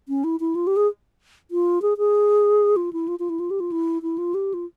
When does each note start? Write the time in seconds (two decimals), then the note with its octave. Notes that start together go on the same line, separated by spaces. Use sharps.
0.08 C#4
0.24 E4
0.40 E4
0.55 F4
0.67 G4
0.76 G#4
1.51 F4
1.82 G#4
1.98 G#4
2.76 F4
2.93 E4
3.08 F4
3.19 F4
3.29 E4
3.40 F4
3.50 G4
3.60 F4
3.72 E4
4.02 E4
4.18 F4
4.34 G4
4.54 F4